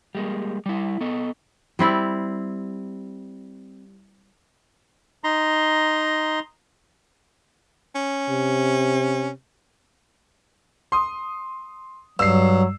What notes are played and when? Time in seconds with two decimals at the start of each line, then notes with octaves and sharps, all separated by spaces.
0.15 G3 G#3 A#3
0.66 G3 E4
1.01 B3 A4 D#5
1.79 G3 C4 E4 D5
5.24 D#4 A#5 C6
7.95 C#4
8.30 C3
10.92 C6 D#6
12.19 G2 F#3 E6 C7